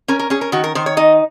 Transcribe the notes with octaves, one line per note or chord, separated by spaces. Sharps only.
C#4 A#4
A#4
C#4 G#4
A#4
D#3 F#4
A#4
D#3 C5
C#5
D#4 D#5